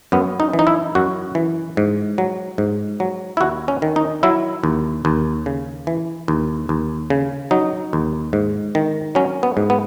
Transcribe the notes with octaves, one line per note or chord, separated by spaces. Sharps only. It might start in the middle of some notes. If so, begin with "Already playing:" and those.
F#2 B3
D#4
E3
D#4
E4
F#2 F#4
E3
G#2
F#3
G#2
F#3
E4
D#2 F#4
C#4
D#3
D#4
F#3 E4
D#2
D#2
C#3
E3
D#2
D#2
C#3
F#3 D#4
D#2
G#2
D#3
F#3 C#4
B3
G#2
B3